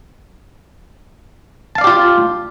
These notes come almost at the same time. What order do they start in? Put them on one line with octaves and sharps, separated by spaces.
A5 F5 D5 G4 F4